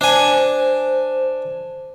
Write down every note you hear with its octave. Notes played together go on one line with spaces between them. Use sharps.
D4 C5 G#5